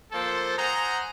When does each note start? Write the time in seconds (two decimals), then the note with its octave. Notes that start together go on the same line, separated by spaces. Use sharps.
0.12 F3 A#3 F4 A4 C5 A5
0.58 C5 D#5 F#5 G#5 A#5